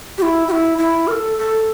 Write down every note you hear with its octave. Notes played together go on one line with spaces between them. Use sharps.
G4
E4
G4
E4
E4
A#4
A4
A4